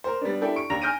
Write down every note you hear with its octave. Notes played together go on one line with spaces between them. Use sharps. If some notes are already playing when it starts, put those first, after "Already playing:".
A#4 C5
G3 B3 D4
D4 E4 G4 A4 D5 G5
C#6 D7
D#2 D4 A#5 A#6 F7
G#5 F6 G6 A#6 D7 D#7